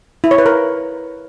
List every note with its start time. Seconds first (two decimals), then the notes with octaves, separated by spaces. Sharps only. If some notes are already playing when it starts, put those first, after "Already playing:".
0.24 E4
0.31 C#5
0.38 B4
0.46 A#4